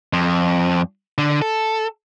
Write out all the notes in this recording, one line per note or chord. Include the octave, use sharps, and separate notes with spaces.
F2
D3
A4